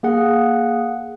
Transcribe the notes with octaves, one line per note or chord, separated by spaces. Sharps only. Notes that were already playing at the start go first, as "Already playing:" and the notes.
A#3 G#4 F#5